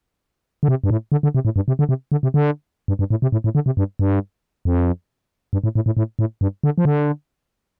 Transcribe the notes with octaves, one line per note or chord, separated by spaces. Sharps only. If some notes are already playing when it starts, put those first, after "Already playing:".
D3
C3
G2
A2
D3
D3
C3
A2
G2
C3
D3
C3
D3
C3
D3
G2
G2
A2
C3
A2
A2
D3
C3
G2
G2
F2
G2
A2
A2
A2
A2
A2
G2
D3
F3
D3